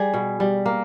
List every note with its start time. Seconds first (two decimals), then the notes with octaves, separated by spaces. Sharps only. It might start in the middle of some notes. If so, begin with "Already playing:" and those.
Already playing: G3 G#4
0.14 B2
0.40 G3
0.66 A#3